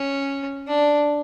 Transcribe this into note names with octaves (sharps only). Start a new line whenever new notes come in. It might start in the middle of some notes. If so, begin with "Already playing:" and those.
Already playing: C#4
D4